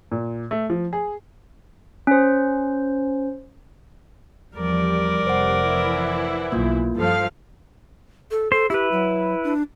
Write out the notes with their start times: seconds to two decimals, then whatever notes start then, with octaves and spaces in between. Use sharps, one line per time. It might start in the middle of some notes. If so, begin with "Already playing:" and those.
0.12 A#2
0.51 A3
0.70 F3
0.93 G#4
2.07 C#4 C5
4.56 E2 F3 G3 A#4 D5
5.27 F1 C5 F#5
5.65 E3 E4
6.52 B1 A#3 F4
6.97 G2 F3 A4 F5
8.31 A4
8.52 A4 C5
8.70 E4 G4 B4
8.92 F#3
9.44 D4